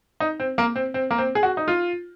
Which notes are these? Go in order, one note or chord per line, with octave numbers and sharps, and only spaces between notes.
D#4
C4
A#3
C4
C4
A#3
C4
G#4
F#4
D#4
F4